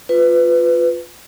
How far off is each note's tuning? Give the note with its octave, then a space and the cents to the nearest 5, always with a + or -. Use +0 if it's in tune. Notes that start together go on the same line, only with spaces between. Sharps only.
F4 +10 B4 +15